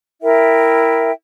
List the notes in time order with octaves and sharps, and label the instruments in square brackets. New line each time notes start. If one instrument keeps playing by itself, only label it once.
[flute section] E4 A#4 E5 G5